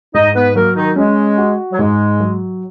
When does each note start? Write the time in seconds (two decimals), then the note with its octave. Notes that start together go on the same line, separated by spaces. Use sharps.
0.14 G#2 D#4 D#5
0.34 B3 B4
0.55 F#3 A#3 A#4
0.76 D#3 D#4
0.96 G#3 C#4
1.38 F#4
1.72 F#3
1.79 G#2 G#3
2.20 F#3